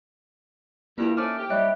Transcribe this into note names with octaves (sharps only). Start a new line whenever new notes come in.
E2 G2 A#3 E4 F4
A3 C#4 D#4 C5 D5 F6
G4
G3 C#5 D#5 E5 F#6